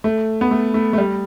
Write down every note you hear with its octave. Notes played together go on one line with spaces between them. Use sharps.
A3
B3
A3
A3
A3
G3